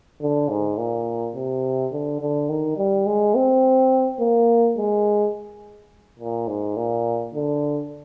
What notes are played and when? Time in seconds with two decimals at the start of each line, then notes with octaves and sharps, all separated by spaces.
0.21 D3
0.49 G#2
0.78 A#2
1.35 C3
1.92 D3
2.21 D3
2.49 D#3
2.78 G3
3.07 G#3
3.35 C4
4.20 A#3
4.77 G#3
6.19 A#2
6.48 G#2
6.77 A#2
7.34 D3